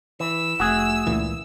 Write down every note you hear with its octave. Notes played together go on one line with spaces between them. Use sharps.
E3 E6
F1 A3 F#4 G#4
C#2 A#2 E3